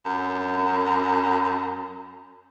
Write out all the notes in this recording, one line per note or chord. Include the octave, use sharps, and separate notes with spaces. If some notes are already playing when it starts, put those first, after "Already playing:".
F#2